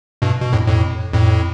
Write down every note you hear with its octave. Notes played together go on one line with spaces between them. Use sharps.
G2 B2
B2
F2 A2
F2 A2
F2 A2